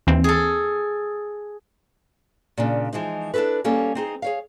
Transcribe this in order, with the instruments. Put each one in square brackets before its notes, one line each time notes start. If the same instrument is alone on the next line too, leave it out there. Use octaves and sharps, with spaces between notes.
[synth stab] D#2 E3 C4
[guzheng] G#4 A4
[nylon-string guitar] A#2 C#3 D4
E3 F3 G#3 D#4
D4 E4 G4 A4 B4
G3 A#3 C#4 A4
C4 D#4 G#4
G#4 C#5 F5